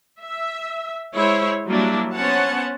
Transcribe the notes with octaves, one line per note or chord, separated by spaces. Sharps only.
E5
G#3 E4 C5 C#5
F#3 G3 A#3 D4 E4
B3 C#4 C5 C#5 F#5 A5